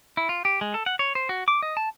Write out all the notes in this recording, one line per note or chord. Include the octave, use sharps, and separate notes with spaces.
E4
F4
G4
G#3
A4
F#5
C#5
C5
F#4
D6
D#5
A5